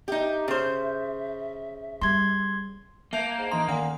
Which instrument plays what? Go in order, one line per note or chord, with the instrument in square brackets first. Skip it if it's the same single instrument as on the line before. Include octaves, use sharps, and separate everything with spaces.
[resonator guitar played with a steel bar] D#4 G4 [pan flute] E5
[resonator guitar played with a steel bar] C#3 C5
[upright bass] G3 [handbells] C6 G#6
[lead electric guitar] A#3 [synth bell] E5 A5 G6
[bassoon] G#2
[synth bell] E3 C6 [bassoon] D#4
[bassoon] A#2 [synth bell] D#3 F#5 D#6